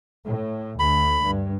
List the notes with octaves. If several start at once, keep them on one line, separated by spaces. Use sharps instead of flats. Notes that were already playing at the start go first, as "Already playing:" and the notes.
A2
D2 B5
G2